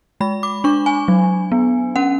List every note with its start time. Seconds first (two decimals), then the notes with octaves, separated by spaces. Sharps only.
0.21 G#3 B5
0.43 D6
0.64 D4 C#6
0.86 G#5
1.08 F#3
1.52 B3
1.96 C#4 F#5